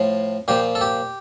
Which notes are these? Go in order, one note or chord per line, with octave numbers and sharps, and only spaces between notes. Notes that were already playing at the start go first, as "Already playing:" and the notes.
Already playing: A2 F3
A#2 F3 G4
A4
G4